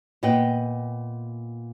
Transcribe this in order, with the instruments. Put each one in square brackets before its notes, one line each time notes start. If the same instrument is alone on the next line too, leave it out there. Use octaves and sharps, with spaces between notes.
[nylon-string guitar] A#2 B3 D#5 F#5 G5